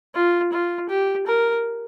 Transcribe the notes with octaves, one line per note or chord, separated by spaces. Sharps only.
F4
F4
G4
A#4